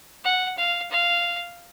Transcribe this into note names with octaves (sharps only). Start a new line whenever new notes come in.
F#5
F5
F5